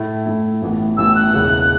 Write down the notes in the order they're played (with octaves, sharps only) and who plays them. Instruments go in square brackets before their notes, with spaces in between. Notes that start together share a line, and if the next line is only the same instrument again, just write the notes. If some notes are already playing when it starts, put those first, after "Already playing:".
Already playing: [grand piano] A2 A3 E4
A2 A3 E4
A1 A2 E3 B3
[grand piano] A1 A2 E3 B3 [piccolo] E6
[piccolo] F#6
[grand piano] E1 E2 C#3 E3 B3